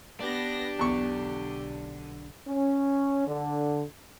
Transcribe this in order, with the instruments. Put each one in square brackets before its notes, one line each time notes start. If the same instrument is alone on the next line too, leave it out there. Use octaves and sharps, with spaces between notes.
[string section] B3 A#6 [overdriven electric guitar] D4 [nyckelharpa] G4
[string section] B1 D3 [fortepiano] E2 C#6
[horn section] C#4
D3